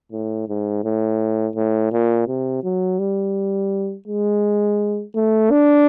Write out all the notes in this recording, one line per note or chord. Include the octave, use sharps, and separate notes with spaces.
A2
G#2
A2
A2
A#2
C3
F#3
G3
G#3
A3
D4